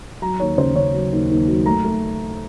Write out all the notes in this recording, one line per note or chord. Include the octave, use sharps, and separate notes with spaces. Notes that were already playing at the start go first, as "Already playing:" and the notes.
F#3 A#5
D#2 C#5
C#3 C5
C#3 C#5
F#3
D#2
D#2
F#3
A3 A#5
A3